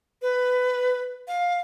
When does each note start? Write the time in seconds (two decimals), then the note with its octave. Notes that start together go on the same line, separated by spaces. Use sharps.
0.22 B4
1.28 F5